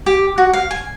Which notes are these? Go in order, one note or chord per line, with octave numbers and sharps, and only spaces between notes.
G4
F#4
F5
G#5